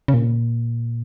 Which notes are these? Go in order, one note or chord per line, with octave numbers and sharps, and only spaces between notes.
C#3
A#2